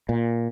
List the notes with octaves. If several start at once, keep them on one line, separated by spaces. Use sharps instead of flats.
A#2